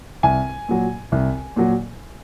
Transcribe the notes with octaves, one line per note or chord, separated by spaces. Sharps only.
C2 G#5
A#2 F#3
C2
A#2 F#3